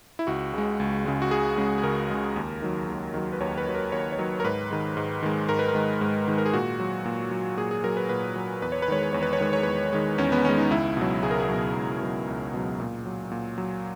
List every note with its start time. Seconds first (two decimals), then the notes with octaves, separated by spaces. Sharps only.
0.19 E4
0.27 C#2 F#4
0.54 C#3 G#3
0.80 C#2
1.05 C#3 G#3
1.22 F#4
1.31 C#2 G#4
1.57 C#3 G#3
1.78 G#4
1.83 C#2 A#4
2.10 C#3 G#3
2.36 D#2
2.62 D#3 F#3
2.89 D#2
3.14 D#3 F#3
3.33 B4
3.40 D#2 C#5
3.58 B4
3.67 D#3 F#3
3.75 A#4
3.92 D#2 C#5
4.12 C#5
4.18 D#3 F#3
4.40 A#4
4.44 G#2 B4
4.71 D#3 G#3
4.97 G#2
5.23 D#3 G#3
5.49 G#2 A#4
5.59 B4
5.68 A#4
5.75 D#3 G#3
6.01 G#2
6.28 D#3 G#3
6.38 A#4
6.46 G#4
6.53 A#2 F#4
6.80 F#3
7.05 A#2
7.31 F#3
7.57 A#2 G#4
7.71 G#4
7.84 F#3 A#4
7.97 B4
8.09 A#2 B4
8.36 F#3
8.62 E2 B4
8.72 C#5
8.82 B4
8.88 D#3 G#3 C#5
9.02 B4
9.13 E2 C#5
9.22 B4
9.33 C#5
9.40 D#3 G#3 B4
9.53 C#5
9.63 E2 B4
9.93 D#3 G#3
10.18 E2 C#4
10.32 B3
10.45 D#3 G#3 C#4
10.58 D#4
10.71 C#2 E4
10.97 B2 F#3
11.23 C#2 G#4
11.31 A#4
11.40 G#4
11.49 F#3
11.54 B2
11.75 C#2
12.01 B2 F#3
12.27 C#2
12.53 B2 F#3
12.80 A#2
13.06 F#3
13.31 A#2
13.58 F#3